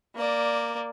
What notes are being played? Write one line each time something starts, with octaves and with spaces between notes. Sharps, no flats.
A#3 D5